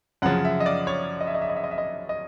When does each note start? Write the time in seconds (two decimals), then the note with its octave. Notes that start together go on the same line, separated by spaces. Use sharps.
0.22 F#2 C#3 F3 F#5
0.45 E5
0.60 D#5
0.66 D5
0.87 C#5
1.20 D#5
1.27 E5
1.35 D#5
1.42 E5
1.49 D#5
1.56 E5
1.64 D#5
1.71 E5
1.78 D#5
2.09 D#5